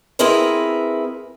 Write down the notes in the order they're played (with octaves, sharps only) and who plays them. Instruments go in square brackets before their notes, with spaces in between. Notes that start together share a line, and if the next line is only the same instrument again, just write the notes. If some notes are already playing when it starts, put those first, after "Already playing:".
[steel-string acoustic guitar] C4 E4 G#4 A#4 B4